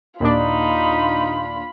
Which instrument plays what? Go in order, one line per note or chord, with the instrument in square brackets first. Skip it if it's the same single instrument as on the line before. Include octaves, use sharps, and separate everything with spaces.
[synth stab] D#2 A#2 D4 [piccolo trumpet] D#4 [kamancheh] F4 B5